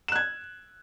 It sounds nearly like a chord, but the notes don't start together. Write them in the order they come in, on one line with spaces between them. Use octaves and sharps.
E7 F#6 G#6